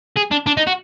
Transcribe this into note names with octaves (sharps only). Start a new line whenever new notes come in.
G#4
D4
D4
D#4
F#4